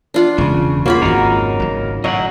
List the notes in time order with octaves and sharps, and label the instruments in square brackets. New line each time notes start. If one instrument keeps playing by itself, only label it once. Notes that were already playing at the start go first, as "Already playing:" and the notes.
[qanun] D4 F4 F#5
[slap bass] E1 G#3 [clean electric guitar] C#3
[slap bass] E2 [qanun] C#3 F4 B5 [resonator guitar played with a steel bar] A#3 F#4
[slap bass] G#1 F2 [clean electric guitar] D#4 A#4
[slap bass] G#1 F#3
[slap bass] A2 [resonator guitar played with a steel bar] F#3 [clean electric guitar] D#5 F5 F#5